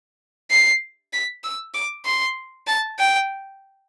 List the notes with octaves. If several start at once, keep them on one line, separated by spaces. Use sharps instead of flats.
C7
B6
E6
D6
C6
A5
G5